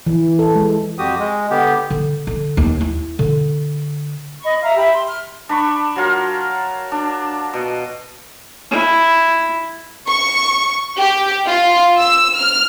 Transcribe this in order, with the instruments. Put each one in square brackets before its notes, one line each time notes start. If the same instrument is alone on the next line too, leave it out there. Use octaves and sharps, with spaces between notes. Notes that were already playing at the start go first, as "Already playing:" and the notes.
[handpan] E3
A4
G#3
[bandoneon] F2 F#4 G4 D#6
G#3
D3 B3 G4
[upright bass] D3
D3
D#2
E4
D3
[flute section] D#5 B5 C#6
E5 F5 A#5
G4 E5 B5
C6
F6
[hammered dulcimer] D4 B5 C#6
F#3 F4 A#4
D4
B2
[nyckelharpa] E4
[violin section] C#6
G4
F4
E6
F6